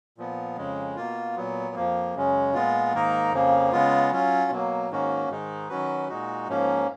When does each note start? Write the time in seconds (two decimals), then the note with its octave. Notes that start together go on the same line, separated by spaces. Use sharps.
0.18 A#2 F3 B3
0.57 F2 C#3 G#3
0.96 B2 A#3 F4
1.36 A#2 F#3 B3
1.75 F2 F3 A#3
2.14 F#2 C#3 G#3 C#4
2.54 A#2 G#3 B3 F4
2.93 G#2 D#3 A#3 D#4 A#4
3.33 F2 C#3 F3 A#3
3.72 C#3 G#3 B3 F4
4.11 F#3 C#4 F4
4.51 B2 F#3 A#3
4.90 G#2 D#3 A#3 C#4 F#4
5.29 G#2 D#3 G#3 D#4
5.69 D#3 F#3 C#4 F#4 B4
6.09 A#2 G#3 D#4 F#4
6.48 G#2 F3 A#3 C#4